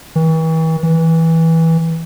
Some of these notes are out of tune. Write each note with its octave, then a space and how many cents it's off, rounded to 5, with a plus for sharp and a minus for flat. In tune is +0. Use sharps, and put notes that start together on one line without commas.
E3 -40
E3 -15